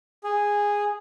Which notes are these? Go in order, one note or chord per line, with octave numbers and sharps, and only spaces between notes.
G#4